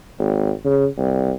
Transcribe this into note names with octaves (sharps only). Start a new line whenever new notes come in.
G#1
C#3
C2